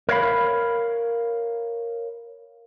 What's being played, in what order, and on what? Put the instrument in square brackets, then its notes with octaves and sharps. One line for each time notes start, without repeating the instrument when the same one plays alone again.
[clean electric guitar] A#4 C#5 F5 B5